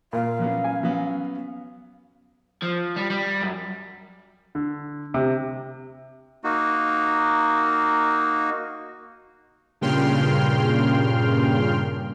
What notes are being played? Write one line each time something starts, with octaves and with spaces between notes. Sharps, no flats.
A#2 F5
F#3 B3 C#4
G#5
F#3 B3 C#4
F3
G3
G3
F#2
D3
C3
A#3 D#4 F#4
G2 A#2 C#3 G5 C6 F6